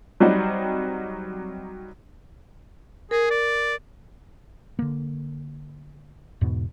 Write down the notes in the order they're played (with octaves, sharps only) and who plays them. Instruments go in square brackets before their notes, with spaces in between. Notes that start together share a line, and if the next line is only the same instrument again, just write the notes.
[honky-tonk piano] F#3 G3 C4 D#4 F#4
[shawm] G#4 [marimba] A#4
[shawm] D5
[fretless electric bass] D3 A#3
E2 G#2 B2